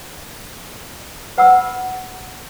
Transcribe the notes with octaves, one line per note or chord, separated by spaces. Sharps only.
B4 F#5 B5 E6